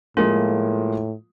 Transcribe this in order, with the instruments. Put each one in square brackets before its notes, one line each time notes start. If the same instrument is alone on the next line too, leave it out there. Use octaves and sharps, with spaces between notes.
[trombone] A2 [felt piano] F3 G#3 A#3 [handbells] F4